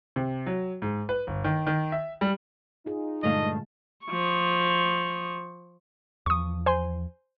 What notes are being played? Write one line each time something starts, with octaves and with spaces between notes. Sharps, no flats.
C3
F#3
G#2
B4
G1
D#3
D#3
E5
G3
D#4 F4 G#4
G2 A#2 D3 G#3 A3 D#5 F5
F3 C#6
E2 F3 C#6 D#6
C5 G#5 C6